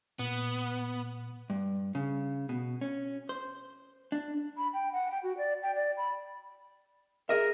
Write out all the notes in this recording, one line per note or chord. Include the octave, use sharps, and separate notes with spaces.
A#2 B3
G2
C#3
B2
C#4
C5
D4
B5
G5
F#5
G5
F#4
D5
G5
D5
B5
G#4 A#4 D#5 E5